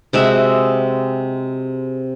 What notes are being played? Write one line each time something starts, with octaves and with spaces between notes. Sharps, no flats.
C3 G#3 F#4 E5